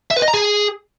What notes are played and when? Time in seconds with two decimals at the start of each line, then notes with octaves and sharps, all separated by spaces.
0.11 E5
0.16 B4
0.22 D#5
0.28 A#5
0.34 G#4